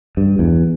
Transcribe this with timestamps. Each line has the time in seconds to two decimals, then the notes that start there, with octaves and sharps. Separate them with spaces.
0.17 G2
0.39 E2